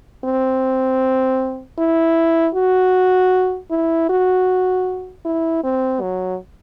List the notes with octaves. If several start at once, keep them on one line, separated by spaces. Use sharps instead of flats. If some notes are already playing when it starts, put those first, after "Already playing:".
C4
E4
F#4
E4
F#4
E4
C4
F#3